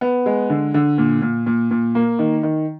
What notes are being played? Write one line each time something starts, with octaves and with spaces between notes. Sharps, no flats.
B3
G#3
D3
D3
A#2
A#2
A#2
A#2
A#3
D#3
D#3